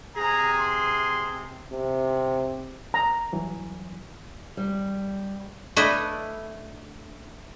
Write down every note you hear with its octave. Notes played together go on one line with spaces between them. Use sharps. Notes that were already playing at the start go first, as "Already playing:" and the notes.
C3 G#4 A#5
C6
C3
A#5
G2 E3 F#3
G3
A3 D4 E4 A4 B4 D#5